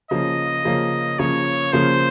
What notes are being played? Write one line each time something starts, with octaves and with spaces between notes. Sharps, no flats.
C#3 F3 A#3 C#4 D#5
C#3 F3 A#3 C#4
C#3 F3 A#3 C#4 C#5
C#3 F3 A#3 C#4 C5